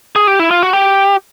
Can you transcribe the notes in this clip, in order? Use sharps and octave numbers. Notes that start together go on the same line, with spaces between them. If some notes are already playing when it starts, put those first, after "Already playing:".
G#4
G4
E4
F4
F#4
G4